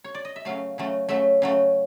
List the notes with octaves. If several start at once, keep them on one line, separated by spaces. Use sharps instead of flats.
C#5
D5
D#5
E5
C#3 F#3 A3 F5
C#3 F#3 A3
C#3 F#3 A3 E5
C#3 F#3 A3